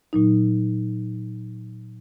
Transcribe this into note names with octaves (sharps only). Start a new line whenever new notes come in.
A#2 F#3 D#4